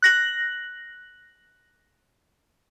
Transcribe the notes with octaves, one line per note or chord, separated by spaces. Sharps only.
F#6 A#6 F#7